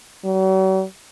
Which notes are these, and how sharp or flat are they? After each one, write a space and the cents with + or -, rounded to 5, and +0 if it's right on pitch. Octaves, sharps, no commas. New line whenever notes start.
F#3 +45